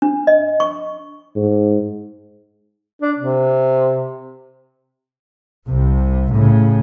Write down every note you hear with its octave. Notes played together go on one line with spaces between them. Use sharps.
D4
D#5
C#6
G#2
D4
C3
C2 C3
A2 C#3